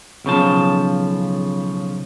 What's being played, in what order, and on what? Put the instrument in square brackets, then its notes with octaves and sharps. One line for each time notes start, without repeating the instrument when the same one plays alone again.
[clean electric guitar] B1 C#3 F3 A5